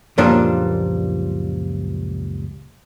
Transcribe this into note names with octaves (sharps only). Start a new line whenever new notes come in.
C#2 F#2 A#2 F3 G3 D4